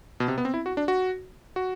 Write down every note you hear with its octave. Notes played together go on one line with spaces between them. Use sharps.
B2
C3
B3
C4
E4
F#4
D4
F#4
F#4